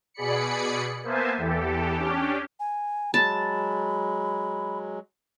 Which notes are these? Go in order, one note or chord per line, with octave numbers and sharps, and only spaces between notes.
B2 G#4 D5 B5 C#7
A#3 B3 C5 E5 G#5 A5
E2 E3 G4 A4
C#4 D4 G4
G#5
F#3 G#3 A5 B5